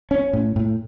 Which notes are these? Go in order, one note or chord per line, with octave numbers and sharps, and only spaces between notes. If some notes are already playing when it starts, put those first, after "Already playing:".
C#4
A2
A2